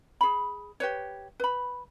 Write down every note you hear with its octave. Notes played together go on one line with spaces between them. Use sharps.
G#4 B5
G4 B4 C#5
B4 B5